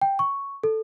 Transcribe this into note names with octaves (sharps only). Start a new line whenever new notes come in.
G5
C#6
A4